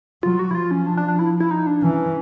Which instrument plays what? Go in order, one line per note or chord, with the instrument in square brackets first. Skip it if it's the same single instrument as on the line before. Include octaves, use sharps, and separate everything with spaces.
[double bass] F#3 [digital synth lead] F4
[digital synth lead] F#4
E4
[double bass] F3 [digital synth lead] F4
[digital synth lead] C#4
D4
D4
D4
E4
E4
D#4
D4
[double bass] E3 [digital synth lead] C#4